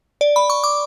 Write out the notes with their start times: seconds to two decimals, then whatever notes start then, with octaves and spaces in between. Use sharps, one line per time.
0.21 D5
0.36 B5
0.50 C#6
0.64 D6